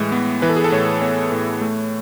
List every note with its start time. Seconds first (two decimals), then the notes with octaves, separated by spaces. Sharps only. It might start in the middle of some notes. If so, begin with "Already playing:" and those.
Already playing: A2 E3 G#3
0.12 B3
0.42 E3 B4
0.49 A4
0.56 G#4
0.64 A4
0.72 A2 C#5
1.02 B3 C#5
1.32 A2
1.61 A3